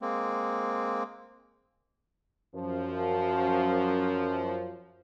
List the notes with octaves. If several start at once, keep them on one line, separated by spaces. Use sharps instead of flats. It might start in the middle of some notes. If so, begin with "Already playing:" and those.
G#3 A#3 C4
F#2 F3